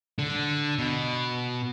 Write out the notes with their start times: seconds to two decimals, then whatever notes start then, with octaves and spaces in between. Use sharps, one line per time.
0.19 D3
0.78 B2